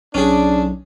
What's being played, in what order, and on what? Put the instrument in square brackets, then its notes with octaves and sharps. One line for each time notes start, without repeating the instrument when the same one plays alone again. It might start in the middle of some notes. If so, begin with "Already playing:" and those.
[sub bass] B1 [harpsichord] C#4 G#4 [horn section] D4